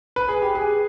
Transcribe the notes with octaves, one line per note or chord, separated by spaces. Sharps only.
B4
G#4
G4
G#4